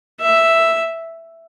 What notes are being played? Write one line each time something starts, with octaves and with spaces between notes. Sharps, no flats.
E5